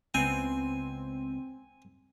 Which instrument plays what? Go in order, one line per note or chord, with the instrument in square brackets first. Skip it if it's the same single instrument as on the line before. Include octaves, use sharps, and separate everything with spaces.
[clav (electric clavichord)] C#2 B3 [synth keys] C4 [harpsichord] G#5